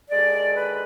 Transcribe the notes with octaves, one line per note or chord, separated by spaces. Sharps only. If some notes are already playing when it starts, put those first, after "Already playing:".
D#2 D3 G#3 D5
B4